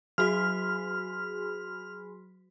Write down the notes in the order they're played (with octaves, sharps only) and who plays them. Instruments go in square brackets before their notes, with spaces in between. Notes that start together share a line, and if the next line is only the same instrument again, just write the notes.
[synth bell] F#3 F#4 B6 [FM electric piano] G#4 B5 C6 [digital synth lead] F6